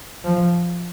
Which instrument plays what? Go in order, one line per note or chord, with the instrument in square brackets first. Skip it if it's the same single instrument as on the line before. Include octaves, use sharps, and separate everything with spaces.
[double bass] F3